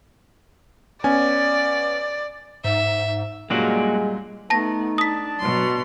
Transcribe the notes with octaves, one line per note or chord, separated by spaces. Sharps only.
B3 C#4 D5 G#5
G#2 E5
F#2 A#2 G3 G#3 A#3 D4 F#4
A3 B3 D#4 A5 A#6
D4 A5 D#6 B6
B2 F#3 C6